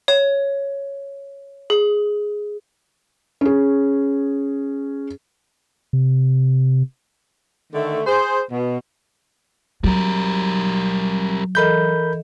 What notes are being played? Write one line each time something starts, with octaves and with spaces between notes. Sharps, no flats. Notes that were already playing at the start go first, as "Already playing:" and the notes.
C#5
G#4
C#4 G#4
C3
D3 D#3 A3
G#4 C5
B2
F#3 G3 A#4
E3 A4 A#4 D#5 B5 G6